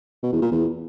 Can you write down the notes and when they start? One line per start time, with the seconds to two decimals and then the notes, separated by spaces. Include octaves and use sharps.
0.23 B2
0.32 E2
0.42 A#2
0.51 E2